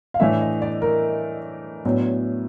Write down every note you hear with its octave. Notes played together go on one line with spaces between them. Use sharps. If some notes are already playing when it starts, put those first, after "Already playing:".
F5
A2 E3 A3 D4 E5
D#5
D5
A#4
A2 F#3 B3 D4